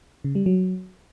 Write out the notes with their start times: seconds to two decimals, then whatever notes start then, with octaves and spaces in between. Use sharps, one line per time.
0.24 C#3
0.35 G3
0.46 F#3